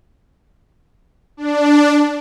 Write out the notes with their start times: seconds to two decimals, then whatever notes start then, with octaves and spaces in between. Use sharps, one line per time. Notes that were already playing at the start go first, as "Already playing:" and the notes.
1.37 D4